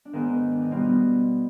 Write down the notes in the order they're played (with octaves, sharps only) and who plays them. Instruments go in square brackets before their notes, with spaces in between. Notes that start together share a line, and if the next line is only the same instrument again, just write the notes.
[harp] D4
G#2 D#3 B3 D#4
D4
D#4
B2 G3 B3 D4 F4